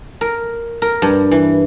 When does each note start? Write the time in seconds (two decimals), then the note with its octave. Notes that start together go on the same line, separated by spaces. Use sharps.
0.21 A#4
0.82 A#4
1.02 G2
1.31 E3